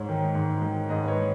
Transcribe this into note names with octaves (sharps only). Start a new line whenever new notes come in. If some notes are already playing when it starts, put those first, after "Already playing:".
Already playing: G#2 C#5
D#3
G#2
D#3
G#2 D#5
B4
C#5
D#3